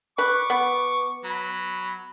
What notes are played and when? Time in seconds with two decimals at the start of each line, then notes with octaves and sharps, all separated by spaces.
0.18 B4 C#6 D6
0.50 B3
1.24 F#3 B5